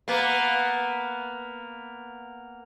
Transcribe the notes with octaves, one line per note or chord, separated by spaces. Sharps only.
A#3 B3